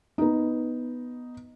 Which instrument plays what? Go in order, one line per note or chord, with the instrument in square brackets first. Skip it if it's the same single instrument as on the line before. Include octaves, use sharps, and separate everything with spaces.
[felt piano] B3 D#4